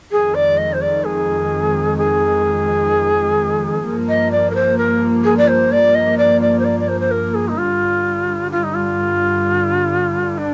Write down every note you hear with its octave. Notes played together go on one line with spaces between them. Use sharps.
F2 D#3 G#3 G#4
D5
D#5
C5
D5
G#4
G#4
G2 F3 A#3
D#5
D5
A#4
C5
A#4
G#4
D5
C5
D5
D#5
D5
D5
C5
D5
D5
C5
C5
A#4
G#4
D#4
G2 D3 G3 F4
F4
D#4
F4
D4